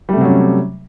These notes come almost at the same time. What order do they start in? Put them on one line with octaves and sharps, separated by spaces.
G3 A3 C3 F#3 C#4